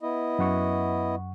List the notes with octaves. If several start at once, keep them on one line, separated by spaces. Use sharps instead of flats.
B3 E4 D#5
F#2 F#5 C#6